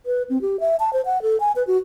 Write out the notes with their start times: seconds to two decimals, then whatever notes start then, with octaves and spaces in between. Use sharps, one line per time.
0.06 B4
0.30 C4
0.42 G4
0.60 E5
0.80 A5
0.93 C5
1.06 F#5
1.22 A4
1.40 G#5
1.56 B4
1.67 F#4